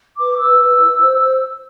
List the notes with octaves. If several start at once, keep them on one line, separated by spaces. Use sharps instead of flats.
B4 D6
B4 E6
B4
E4
C5
C5